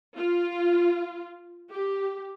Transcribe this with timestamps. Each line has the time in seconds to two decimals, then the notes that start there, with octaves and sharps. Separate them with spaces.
0.16 F4
1.73 G4